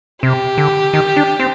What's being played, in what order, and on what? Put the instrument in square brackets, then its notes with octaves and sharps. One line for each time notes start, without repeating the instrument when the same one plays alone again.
[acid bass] C3 [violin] G4
[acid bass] D3
D#3
D4
C4